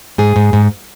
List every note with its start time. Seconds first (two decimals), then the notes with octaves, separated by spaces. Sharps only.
0.18 G#2 G#4
0.36 G#2
0.53 G#2